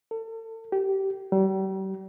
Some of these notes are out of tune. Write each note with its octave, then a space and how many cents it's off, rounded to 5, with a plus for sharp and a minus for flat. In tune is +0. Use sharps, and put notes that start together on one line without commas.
A4 +35
G4 -20
G3 -40